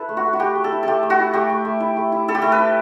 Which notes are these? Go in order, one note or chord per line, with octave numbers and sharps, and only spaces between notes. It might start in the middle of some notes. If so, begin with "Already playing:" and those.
Already playing: E4 A4 B4
A3
F#4
A3
F#4
A3 G4
A3
A4
E4
A3 G4 A4
A3
F#4
E4
A3 G4
A3
A3
E4
A3
E4
E4 A4
G4
A3 A4
B4
E4